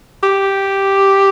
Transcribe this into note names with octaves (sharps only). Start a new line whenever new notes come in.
G4